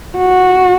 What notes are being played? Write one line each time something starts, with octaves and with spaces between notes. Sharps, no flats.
F#4